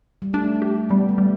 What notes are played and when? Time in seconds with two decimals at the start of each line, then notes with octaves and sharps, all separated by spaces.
0.22 G3
0.33 A3 D4
0.62 G4
0.89 G3 B3
1.09 A3
1.18 G3